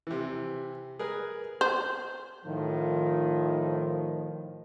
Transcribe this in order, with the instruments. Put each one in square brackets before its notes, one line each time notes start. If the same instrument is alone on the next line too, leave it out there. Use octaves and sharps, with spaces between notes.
[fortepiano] C3 E3
G#4 A#4 B4
[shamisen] C5
[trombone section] A2 D#3 F3